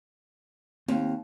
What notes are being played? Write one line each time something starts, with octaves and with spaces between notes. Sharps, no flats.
D#2 C4